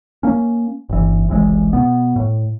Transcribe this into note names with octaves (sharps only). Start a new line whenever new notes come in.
A#3 C#4
G1 E3
F#1 C2 E3 G#3
B2 B3
A2